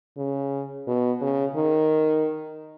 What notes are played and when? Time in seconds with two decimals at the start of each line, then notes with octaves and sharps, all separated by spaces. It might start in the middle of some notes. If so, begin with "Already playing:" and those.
0.17 C#3
0.88 B2
1.21 C#3
1.56 D#3